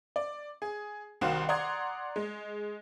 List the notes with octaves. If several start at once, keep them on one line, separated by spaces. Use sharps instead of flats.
D5
G#4
C2 D#3 F#4 C5 F5
D5 F#5 A#5 C6 D#6 G#6
G#3